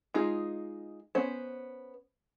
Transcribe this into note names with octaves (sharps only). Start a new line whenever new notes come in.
G#3 D#4 F4 G#4
B3 C#4 C5